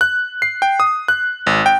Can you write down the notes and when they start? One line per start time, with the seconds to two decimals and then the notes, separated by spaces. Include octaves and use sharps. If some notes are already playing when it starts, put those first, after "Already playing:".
0.01 F#6
0.42 C7
0.62 G5
0.80 D#6
1.08 F#6
1.47 G#1
1.66 G5